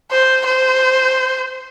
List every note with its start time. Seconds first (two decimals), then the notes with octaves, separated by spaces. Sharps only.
0.11 C5
0.46 C5